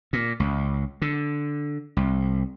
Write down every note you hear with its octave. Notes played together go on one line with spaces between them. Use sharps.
A#2
C#2
D3
C2